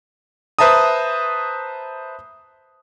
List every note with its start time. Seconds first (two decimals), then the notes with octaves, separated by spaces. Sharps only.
0.59 B4 C5 E5 A5 A#5 D#6